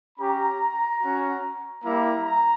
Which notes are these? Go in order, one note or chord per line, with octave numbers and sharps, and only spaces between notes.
C#4 G4 A#5
C#4 F#4
G3 A#3 E4 A#5
A#5